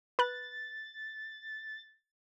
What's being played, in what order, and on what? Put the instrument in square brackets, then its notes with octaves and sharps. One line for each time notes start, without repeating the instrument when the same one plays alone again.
[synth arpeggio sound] B4 F#6 [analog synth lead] A6